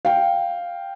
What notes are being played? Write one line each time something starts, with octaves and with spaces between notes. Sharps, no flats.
F5 G5